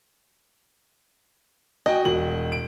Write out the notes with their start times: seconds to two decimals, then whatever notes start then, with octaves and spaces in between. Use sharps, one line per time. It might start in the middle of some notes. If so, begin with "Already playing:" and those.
1.86 F#4 D#5 G5 G#5
2.05 E1 F#7
2.52 D7